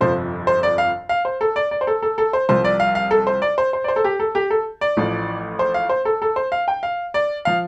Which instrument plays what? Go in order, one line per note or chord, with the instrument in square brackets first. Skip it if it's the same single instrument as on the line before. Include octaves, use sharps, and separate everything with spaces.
[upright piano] G1 F2 C3 F3 C5
C5
D5
F5
F5
C5
A4
D5
D5
C5
A4
A4
A4
C5
C2 C3 F3 C5
D5
F5
F5
A4
C5
D5
C5
C5
D5
C5
A4
G4
A4
G4
A4
D5
A1 A2 F3
C5
F5
C5
A4
A4
C5
F5
G5
F5
D5
F3 F5